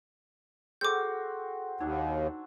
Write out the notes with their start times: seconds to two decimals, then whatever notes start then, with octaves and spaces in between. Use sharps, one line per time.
0.81 C4 F#4 G#4 A4 D6 G6
1.81 D#2 F#3 D4 D#4 A4